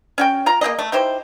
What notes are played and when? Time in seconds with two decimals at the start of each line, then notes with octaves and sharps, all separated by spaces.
0.18 C#4 F#4 G5
0.46 F4 A#5
0.61 A#3 D#4 G#4 D#5
0.79 A3
0.92 D#4 E4 G4 C5